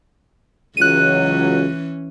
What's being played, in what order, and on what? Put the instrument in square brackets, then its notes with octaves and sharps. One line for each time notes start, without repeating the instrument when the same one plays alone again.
[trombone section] C#2 F#3 [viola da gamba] E3 C#4 [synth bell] F#6 D#7